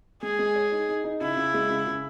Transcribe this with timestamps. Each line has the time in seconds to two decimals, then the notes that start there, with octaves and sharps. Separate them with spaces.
0.23 G#3 G#4
0.39 G#3
0.56 C#5
0.72 D#4
0.89 D#4
1.04 D#4
1.21 C#3 E4
1.37 C#3
1.54 G#3
1.70 C#3
1.87 C#3